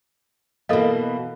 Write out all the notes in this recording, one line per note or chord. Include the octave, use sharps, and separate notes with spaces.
B2 E3 A#3 A4 D#5 F5